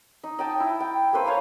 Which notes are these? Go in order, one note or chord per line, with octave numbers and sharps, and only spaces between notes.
D#4
D#4 G5 A5
E4
G5
A#3 A4 B4 C5
C#5 F5 G#5 A#5